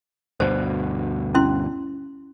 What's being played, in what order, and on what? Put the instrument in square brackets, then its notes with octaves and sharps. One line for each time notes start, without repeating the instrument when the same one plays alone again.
[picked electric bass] D2 G2 B2 [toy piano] C5
[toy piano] C#4 E4 C6